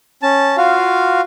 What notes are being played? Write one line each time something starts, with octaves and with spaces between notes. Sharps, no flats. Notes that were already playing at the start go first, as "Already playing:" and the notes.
C#4 A5
F4 F#4 F5